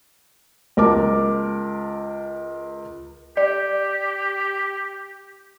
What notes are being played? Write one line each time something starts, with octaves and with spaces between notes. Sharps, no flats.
C#2 A#4 A5 D6
G4 D5